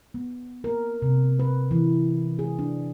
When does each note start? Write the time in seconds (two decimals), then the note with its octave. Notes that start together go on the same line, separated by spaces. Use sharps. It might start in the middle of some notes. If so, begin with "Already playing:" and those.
0.14 B3
0.64 A#4
1.02 C3
1.39 B4
1.71 E3
2.39 G#4
2.59 D4